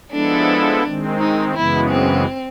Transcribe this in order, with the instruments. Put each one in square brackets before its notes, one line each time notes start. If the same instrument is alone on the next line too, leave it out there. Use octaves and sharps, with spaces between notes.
[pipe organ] F3 G#3 B3 E4 A4 [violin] D4
[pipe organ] D#3 G#3 C4
[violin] D#4
[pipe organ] F#2 C#3 E3 G#3 B3 [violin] E4
[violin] C4